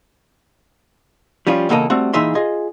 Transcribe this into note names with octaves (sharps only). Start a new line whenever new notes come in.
F3 G3 C#4 F4
E2 A#2 C#3 A#3 A4 D#5
G3 A3 C4 F#4
A#2 E3 D#4 G#4 E5 C6
F4 G#4 D#5